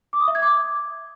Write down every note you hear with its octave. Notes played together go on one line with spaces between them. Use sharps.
D6
D#6
E5
G#6
D6